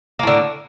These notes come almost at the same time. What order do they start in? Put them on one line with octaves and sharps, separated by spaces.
A#3 A2 D3